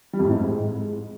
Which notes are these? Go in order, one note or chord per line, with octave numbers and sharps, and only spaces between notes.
G3
F2
A2
G#2
G#3